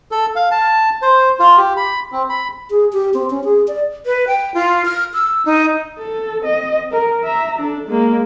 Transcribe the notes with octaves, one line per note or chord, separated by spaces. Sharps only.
A4
F5
A5
C5
F4
G4
B5
C4
B5
G#4
G4
C4
C#4
G#4
D5
B4
G5
F4
F6
E6
D#4
A4
C4 D#5
A#4
E5 A#5
D4 A4
G#3 A#3